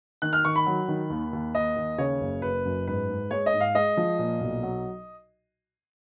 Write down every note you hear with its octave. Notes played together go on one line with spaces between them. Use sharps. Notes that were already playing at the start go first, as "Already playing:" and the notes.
D#3 F#6
F6
D#3 C#6
B5
F#3
D#3
D#2
D#2
D#2 D#5
D#2
C#3 C#5
F#1
F#1 B4
F#2
G#2 B4
G#2
G#3 C#5
D#5
G#2
F5
G#3 D#5
F3
A#2
B1
F#3